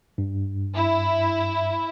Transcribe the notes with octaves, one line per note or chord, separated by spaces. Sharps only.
G2
E4